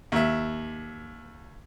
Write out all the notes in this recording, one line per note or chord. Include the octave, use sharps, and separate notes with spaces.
D#2 E5